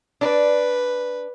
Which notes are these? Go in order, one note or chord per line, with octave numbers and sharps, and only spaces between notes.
D4 B4 D5